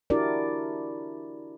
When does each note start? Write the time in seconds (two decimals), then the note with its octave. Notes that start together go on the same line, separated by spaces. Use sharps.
0.10 D4 E4 F#4 G4 A#4 D5